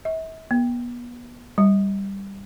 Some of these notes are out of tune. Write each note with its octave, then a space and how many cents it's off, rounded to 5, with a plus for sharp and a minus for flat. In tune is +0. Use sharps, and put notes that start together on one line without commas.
E5 -40
B3 -35
G3 +5